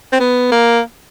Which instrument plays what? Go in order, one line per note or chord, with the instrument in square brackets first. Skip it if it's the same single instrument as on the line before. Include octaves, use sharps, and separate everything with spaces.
[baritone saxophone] C4
B3
A#3